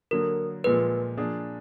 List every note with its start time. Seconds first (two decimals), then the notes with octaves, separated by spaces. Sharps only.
0.11 D3 F#3 A#3 A#4
0.64 A#2 F3 G#3 B4
1.17 F3 A#3 D4 G#4